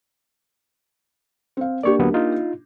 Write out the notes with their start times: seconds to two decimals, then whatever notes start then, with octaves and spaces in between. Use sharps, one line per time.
1.57 C4 F5
1.83 A#3 D4 G4 D5 C#6
1.99 D2 F#3 B3
2.14 D#4 F4